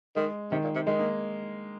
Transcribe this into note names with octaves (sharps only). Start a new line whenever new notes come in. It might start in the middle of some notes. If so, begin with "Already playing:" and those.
D#3 G#3
C3 D#3
A#2
C3
D#3 G#3
A#3